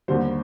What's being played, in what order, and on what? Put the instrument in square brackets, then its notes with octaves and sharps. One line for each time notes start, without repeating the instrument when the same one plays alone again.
[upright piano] D#2 D3 G3 C5